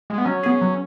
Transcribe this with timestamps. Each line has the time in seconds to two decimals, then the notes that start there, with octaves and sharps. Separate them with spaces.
0.10 G#3
0.18 B3
0.25 F#3 C#4
0.43 B3 G#4
0.61 F#3